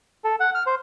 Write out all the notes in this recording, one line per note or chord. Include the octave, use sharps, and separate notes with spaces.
A4
F#5
F6
C5